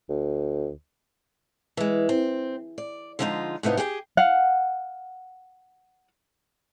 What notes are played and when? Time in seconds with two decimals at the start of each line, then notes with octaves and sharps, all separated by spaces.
0.09 D2
1.77 E3 G#3
2.09 C4
2.78 D5
3.19 D3 F3 G#3 B3 D#4 F4
3.63 A2 C3 B3 D#4 F4
3.77 G4 G#4 F#5 G5
4.17 F5 F#5